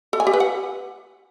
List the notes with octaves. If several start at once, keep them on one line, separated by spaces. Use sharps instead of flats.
A4
G#5
G4
B4
F#5